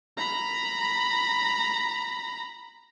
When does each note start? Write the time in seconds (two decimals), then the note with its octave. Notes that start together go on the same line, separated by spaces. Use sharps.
0.17 A#5 B5